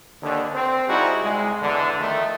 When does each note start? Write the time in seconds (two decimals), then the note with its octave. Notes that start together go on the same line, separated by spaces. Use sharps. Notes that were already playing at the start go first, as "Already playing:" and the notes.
0.22 D#2 D3
0.54 C4
0.87 G3 D#4 E4 F#4 G#4
1.21 C2 G#3
1.61 E2 G#2 D3
1.99 D#3 F3 A3